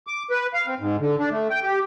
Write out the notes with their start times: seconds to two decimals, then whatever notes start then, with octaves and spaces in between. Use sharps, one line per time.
0.07 D6
0.31 B4
0.54 F5
0.67 C4
0.80 G#2
1.00 D3
1.19 D4
1.31 A3
1.51 G5
1.64 G4